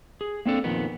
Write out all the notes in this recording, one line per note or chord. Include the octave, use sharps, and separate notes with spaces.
G#4
A#3 C4 D4 A4
F2 A#2 D#3 B3